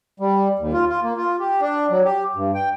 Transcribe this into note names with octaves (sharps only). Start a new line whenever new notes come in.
G3
D#2
F4
F4
A#3
F4
G4
D4
F#3
G4
G2
G5